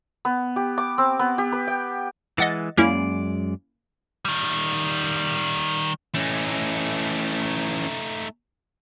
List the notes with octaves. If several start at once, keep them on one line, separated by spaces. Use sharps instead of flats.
B3
G4
D6
C4
B3
G4
B4
G5
E3 G#3 D#5 F#5 A6
F#2 G#3 A#3 C#4 E4 D5
D#3 G3
E3 A3 C#4 D#4